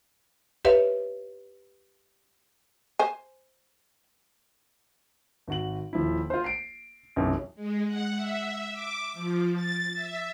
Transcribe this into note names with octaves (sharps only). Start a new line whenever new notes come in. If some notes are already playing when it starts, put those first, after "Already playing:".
G4 B4 C#5 E5 F5
C5 G#5
G#1 F#4 F#7
D#1 F3 E4
F4 C5
C7 D7
B1 F#2 C3 E3
G#3
F#5
E5
D6
F3
A6
E5